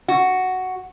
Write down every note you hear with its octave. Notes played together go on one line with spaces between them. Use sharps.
F#4